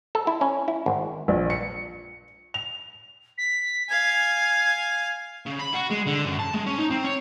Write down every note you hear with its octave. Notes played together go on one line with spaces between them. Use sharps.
A4
E4
C#4
E4
G#1
A#1
C#7
F7
B6
F5 G#5 G#6
C#3
B5
F#4
G#3
D3
F#2
A5
G#3
C#4
D#4
C4
C#5